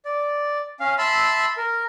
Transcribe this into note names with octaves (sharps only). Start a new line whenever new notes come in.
D5
C#4 F5
E5 A5 B5 C6 E6
A#4